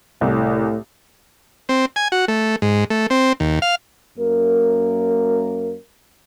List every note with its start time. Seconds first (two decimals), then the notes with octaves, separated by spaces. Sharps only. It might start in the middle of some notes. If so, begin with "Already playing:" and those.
0.21 C2 A2
1.69 C4
1.96 G#5
2.12 F#4
2.28 A3
2.62 G#2
2.90 A3
3.10 C4
3.40 D#2
3.62 F5
4.18 F#2 A#3 A#4